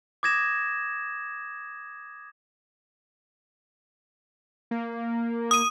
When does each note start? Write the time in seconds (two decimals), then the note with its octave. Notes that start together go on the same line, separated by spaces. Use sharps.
0.23 D6 D#6 G#6 A#6 E7
4.71 A#3
5.51 D#6 D#7